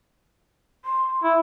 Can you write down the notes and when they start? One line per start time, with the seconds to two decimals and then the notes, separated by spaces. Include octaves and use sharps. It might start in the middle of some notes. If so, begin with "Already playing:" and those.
0.85 C6
1.24 E4